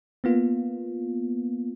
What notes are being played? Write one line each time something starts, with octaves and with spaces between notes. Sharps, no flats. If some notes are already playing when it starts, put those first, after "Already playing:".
A#3 B3 F4